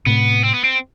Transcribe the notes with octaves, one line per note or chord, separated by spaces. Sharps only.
A2 C3 B3
C4
B3
C4